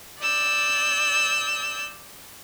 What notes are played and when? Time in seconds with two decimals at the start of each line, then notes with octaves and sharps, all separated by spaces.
0.19 D5 E6 G6